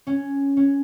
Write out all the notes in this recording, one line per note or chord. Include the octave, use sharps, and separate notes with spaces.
C#4
C#4